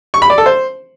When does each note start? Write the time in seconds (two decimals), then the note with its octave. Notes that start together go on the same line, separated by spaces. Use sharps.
0.14 C#6
0.22 B5
0.30 D5
0.38 A4
0.46 C5